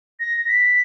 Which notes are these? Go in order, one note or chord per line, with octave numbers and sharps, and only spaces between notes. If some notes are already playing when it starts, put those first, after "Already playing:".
A#6
A#6
B6